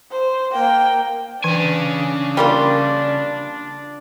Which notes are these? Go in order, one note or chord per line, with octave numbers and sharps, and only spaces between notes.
C5
A#3 G5
C#3 E3 D4 G#5
G3 A#3 F4